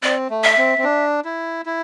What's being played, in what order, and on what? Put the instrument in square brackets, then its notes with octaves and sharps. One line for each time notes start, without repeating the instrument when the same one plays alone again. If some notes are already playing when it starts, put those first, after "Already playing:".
[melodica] C4 [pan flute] D5
[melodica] A3
[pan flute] E5
[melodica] C4
C4
D4
E4
E4